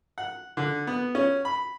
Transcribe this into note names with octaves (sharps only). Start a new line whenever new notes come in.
F#5
D3
B3
C#4
B5